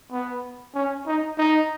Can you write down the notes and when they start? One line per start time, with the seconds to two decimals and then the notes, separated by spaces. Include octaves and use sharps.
0.11 B3
0.75 C#4
1.07 D#4
1.38 D#4